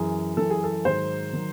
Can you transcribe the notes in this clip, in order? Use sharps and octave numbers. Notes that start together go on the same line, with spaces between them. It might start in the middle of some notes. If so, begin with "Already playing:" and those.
Already playing: F#2 E3 G#4
F#2 E3 A4
G#4
A4
G#2 D#3 F#3 C5
D#3 F#3